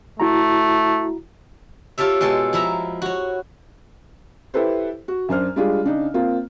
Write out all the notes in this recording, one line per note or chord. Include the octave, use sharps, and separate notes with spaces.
A3 E4 F#4 A#5
F4 G4 A4 C#5 E5
B2 G#3 A4 C6
F3 E4 E5 A#5
F#4 C#5
E4 G4 A4 B4 C5
F#4
F#2 D4 C5 F6
G3 G#3 D4 F4 G#4
C#3 D4 D#4
A#3 C4 F4